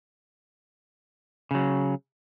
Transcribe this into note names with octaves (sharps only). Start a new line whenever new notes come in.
C#3 F#3